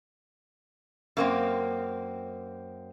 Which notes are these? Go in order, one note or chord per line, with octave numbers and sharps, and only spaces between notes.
F#2 A#3 C4